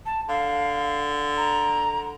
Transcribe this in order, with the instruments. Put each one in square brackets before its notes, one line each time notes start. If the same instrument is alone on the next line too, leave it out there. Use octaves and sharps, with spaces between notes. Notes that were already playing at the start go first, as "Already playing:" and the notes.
[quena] A5
[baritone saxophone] D3 [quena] F5
[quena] A#5